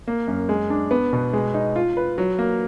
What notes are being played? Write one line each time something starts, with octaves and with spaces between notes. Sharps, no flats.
A#3
F#2
G#3
D4
B3
B2
G#3
D#4
F4
B4
F#3
A#3